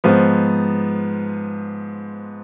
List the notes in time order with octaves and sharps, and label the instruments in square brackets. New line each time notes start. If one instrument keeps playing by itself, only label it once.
[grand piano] G#2 F3 B3